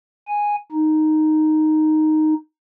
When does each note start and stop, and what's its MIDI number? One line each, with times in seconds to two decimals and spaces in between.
0.28 0.55 80
0.72 2.34 63